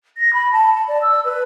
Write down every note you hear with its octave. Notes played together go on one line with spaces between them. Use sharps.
A#6
B5
A5
A5
D5
E6
B4